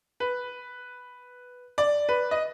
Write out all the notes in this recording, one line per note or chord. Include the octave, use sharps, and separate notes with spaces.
B4
D5
B4
D#5